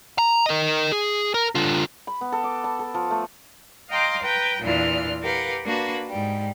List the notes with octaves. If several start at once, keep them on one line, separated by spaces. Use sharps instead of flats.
A#5
A#4 D#5
G#4
A#4
D3 F4
B5
B3
A4
D6
A5
A4
F3
A3
D#5 F5 G5 A#5 C6 D6
B4 G5 A#5
E2 A#2 E3 D4 F4 F6
G4 A#4 B4 F5 F#5
A#3 D4 F#4 B4
G#2 G3